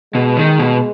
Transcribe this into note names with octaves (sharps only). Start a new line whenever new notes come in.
B2 G#3
D#3
B2